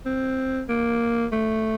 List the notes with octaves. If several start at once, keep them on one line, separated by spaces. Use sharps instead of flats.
C4
A#3
A3